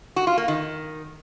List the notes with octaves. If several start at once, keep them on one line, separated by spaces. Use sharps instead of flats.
F#4
F4
A#3
D#3